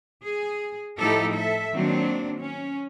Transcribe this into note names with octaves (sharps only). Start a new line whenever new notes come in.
G#4
A2 F3 D#4 E4 G4 A4
A4 E5
D#3 F#3 A#3 C4 D4
C#4